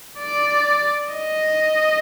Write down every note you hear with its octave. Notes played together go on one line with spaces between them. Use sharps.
D5
D#5